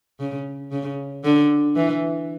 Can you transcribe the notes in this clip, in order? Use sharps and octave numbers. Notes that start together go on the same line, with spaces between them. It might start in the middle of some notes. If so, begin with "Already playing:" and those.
C#3
C#3
D3
E3